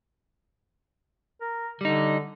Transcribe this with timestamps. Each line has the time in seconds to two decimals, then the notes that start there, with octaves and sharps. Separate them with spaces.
1.41 A#4
1.81 D3 G3 D#4